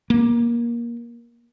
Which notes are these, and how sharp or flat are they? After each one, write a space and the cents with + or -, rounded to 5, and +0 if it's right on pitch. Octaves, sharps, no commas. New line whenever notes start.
A#3 +20